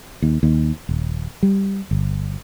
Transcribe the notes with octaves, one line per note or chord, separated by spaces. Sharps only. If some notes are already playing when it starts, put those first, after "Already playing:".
D#2
D#2
D#1
G3
G1